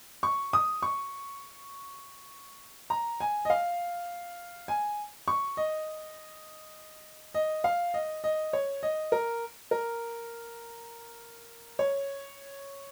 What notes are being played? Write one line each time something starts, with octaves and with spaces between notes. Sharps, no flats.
C#6
D#6
C#6
A#5
G#5
D#5
F5
G#5
C#6
D#5
D#5
F5
D#5
D#5
C#5
D#5
A#4
A#4
C#5